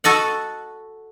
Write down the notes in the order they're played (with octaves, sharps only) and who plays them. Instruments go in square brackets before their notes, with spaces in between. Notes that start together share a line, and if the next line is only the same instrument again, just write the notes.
[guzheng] F#4 A4 D#5 F#5